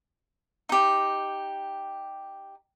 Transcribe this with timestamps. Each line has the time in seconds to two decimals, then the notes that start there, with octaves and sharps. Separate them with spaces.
0.69 D#4 G4